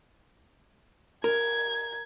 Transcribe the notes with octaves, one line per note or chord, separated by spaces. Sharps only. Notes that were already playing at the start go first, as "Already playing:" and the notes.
A#4 G#6